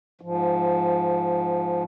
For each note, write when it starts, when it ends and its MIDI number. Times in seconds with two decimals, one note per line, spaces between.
0.21 1.84 44
0.21 1.84 53